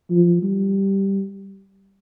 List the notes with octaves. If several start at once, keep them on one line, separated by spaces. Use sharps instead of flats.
F3
G3